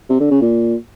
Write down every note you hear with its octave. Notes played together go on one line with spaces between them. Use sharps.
C3
D3
C#3
A#2